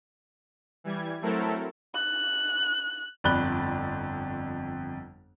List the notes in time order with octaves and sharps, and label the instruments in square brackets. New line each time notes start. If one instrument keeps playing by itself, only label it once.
[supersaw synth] E3 G3 G#6
F#3 A3 C4 E4 A4 A#4
[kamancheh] F#6
[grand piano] G1 F2 D5 B5 F#6 G7